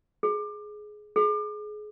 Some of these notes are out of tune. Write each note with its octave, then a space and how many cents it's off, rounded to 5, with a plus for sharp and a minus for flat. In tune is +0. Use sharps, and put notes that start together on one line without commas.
G#4 +15
G#4 +25